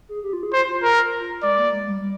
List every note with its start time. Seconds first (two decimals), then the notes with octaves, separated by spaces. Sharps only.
0.09 G#4
0.23 G4
0.33 F4
0.43 G#4
0.53 F4 C5
0.68 F4
0.83 A#4
1.43 G#3 D5
1.58 A#3
1.73 G#3
1.88 G3
2.02 G3